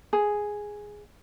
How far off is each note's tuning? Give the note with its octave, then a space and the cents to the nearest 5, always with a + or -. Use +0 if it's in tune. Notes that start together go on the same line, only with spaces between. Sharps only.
G#4 +0